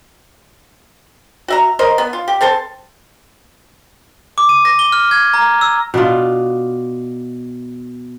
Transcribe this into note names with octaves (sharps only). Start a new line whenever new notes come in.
F#4 E5 A#5
A#4 C5 D#5
B3
F4
G4
C4 A4 C5 A5
D6
D#7
A#6
G7
F6
G#6
A#5
E6
B2 D4 F4